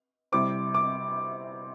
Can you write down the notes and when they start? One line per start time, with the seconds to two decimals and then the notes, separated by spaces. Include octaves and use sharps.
0.32 C3 G3 C4 E4 D6
0.74 D6